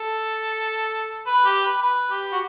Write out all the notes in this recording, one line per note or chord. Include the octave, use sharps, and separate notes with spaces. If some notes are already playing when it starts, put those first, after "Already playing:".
Already playing: A4
B4
G4
B4
B4
G4
F#4